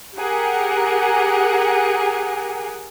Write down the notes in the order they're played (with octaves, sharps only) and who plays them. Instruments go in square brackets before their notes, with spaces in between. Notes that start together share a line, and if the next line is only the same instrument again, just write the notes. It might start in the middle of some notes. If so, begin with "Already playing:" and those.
[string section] G4 G#4 A#4 F#5